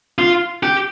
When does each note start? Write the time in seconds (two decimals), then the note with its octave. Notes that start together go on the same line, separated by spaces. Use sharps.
0.19 F4
0.63 G4